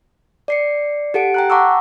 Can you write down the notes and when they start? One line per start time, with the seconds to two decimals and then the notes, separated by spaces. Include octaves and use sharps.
0.48 D5 C7 C#7
1.14 G4 A4 F#5 D7
1.34 G5 A#5 F#6
1.50 F#5 A5 A#5 C#6 D6 E6